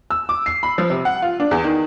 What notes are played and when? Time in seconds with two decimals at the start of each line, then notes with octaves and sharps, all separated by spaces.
0.10 E6
0.29 D6
0.46 C7
0.63 B5
0.78 F3
0.90 C3
1.05 F#5
1.22 F4
1.40 D4
1.51 E2
1.64 D#3